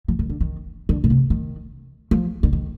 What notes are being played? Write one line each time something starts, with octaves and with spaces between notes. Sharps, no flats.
F3
D#3
D3
D#3
D3
A#2
C3
D#3
F3
D3
D#3